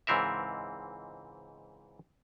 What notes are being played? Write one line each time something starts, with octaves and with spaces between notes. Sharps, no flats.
C#2 G#2 E3 C4 A#4 E5